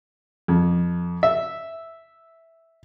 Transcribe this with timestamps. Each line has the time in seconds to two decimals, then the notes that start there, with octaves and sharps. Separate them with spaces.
0.48 F2
1.23 E5